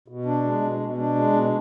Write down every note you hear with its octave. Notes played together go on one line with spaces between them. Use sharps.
B2
D4
G#3
B2
B2
D4
G#3
B2